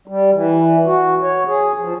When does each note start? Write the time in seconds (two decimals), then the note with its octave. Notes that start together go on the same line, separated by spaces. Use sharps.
0.08 G3
0.34 E3
0.86 F#4
1.22 C#5
1.47 G#4
1.78 F3